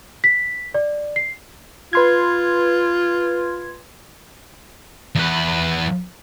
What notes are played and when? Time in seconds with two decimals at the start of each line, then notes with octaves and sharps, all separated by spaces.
0.24 B6
0.74 D5
1.16 C7
1.93 F4 B4 C6 G#6
5.15 E2 B4